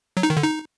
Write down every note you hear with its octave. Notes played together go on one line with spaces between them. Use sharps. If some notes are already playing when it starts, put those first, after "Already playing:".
F#3
D#4
D#3
D3
D#4